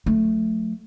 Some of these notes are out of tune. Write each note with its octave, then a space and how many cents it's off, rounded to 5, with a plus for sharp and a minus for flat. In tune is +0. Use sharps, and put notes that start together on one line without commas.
F#3 -45 A3 +0